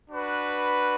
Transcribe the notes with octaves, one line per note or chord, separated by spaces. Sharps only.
D4 F#4 B4